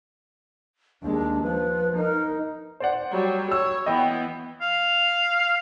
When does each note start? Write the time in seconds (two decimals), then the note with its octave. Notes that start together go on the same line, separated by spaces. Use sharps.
1.02 D#2 G#3 D4
1.43 F3 B4
1.96 D#4 A#4
2.80 C5 D5 F#5
3.11 F#3 G3
3.52 C#5 E6
3.86 E3 B3 D#5 G5
4.61 F5